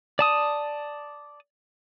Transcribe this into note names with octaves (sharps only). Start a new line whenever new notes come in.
D5 A5 D#6